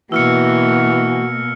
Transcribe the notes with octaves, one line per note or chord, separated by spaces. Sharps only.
B2 E3 A#3 F#4 E6 F6 C#7